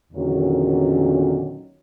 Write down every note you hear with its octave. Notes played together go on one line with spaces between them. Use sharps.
E2 A#2 D3 D#3 F#3 C#4